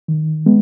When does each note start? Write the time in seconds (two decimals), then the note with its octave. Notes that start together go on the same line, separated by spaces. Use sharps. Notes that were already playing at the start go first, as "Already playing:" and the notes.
0.08 D#3
0.46 G#3 B3